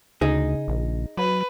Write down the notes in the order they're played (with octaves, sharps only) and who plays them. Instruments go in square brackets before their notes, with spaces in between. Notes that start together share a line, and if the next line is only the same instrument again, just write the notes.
[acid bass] D2 [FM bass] C#3 [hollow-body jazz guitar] D#4 G#4
[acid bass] A#1
[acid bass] F#3 [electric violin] B4